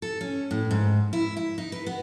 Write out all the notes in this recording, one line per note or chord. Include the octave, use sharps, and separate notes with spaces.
A4
C#4
A2
G#2
E4
E4
D#4
B4
B3